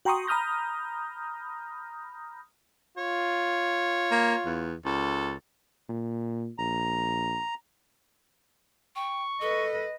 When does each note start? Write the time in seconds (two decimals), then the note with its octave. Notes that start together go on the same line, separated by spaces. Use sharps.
0.05 F#4 G5 A#5 C6 C#6 D#6
0.27 A#5 B5 D#6 F6 G6 A#6
2.98 F4 C#5
4.12 A#3
4.46 E2
4.85 C#2 A4
5.89 A#2
6.58 A#1 A#5
8.96 G5 C#6
9.41 A4 B4 D#5